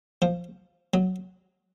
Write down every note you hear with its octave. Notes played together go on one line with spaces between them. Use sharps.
F3
F#3